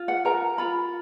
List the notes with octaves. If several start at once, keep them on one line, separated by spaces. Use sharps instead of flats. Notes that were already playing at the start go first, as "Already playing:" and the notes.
Already playing: F4
F#5
A#4 A#5
F4 B5